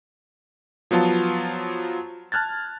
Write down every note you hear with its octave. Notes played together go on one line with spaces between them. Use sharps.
F3 F#3 B3 F4 A5
A5 F6 F#6 G#6 A6